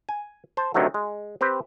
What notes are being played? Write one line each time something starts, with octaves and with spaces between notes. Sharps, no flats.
G#5
C5 A5
D2 C3 D#3 F#3 A3
G#3
C4 G4 B4 C5